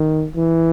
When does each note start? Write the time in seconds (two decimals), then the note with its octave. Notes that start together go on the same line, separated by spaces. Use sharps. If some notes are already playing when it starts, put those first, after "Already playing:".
Already playing: D#3
0.36 E3